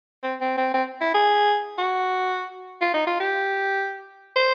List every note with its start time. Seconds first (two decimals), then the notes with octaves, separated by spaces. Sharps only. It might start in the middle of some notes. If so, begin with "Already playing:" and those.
0.23 C4
0.41 C4
0.57 C4
0.74 C4
1.01 E4
1.14 G#4
1.78 F#4
2.81 F4
2.94 D#4
3.07 F4
3.20 G4
4.36 C5